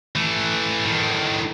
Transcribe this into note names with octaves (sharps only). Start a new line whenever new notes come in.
E3 A3
A2 D#3